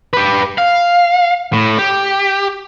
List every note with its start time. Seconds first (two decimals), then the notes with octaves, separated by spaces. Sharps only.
0.13 G4 B4
0.58 F5
1.53 A2
1.79 G4